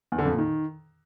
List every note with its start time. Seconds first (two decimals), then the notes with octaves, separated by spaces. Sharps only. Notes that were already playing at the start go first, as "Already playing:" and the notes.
0.12 E2
0.19 D3
0.25 F2
0.32 A#2
0.38 D#3